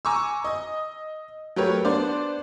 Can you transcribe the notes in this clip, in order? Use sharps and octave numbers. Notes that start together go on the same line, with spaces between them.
G#5 A#5 C#6 D6 E6
D#5 D#6
F#3 A3 G4 A#4 B4 C#5
B3 D4 C5 D5